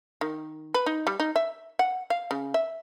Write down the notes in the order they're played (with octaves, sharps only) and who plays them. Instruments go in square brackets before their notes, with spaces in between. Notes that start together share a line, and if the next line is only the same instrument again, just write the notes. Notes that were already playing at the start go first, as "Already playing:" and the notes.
[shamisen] D#3
B4
D#4
G3
D#4
E5
F#5
F5
C#3
E5